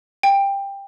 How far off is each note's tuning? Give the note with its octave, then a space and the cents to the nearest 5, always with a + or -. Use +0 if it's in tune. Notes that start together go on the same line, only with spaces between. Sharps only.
G5 +15